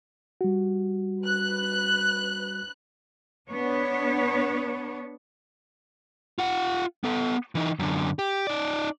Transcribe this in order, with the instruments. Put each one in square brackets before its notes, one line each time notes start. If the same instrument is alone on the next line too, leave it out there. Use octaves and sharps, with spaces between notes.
[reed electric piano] G3 F#4
[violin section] B4 F#6
[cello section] B3 D4 C#5
[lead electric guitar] F4 F#5
B3 A4
E3 D#4
F#2 D3
G4
D#4 D5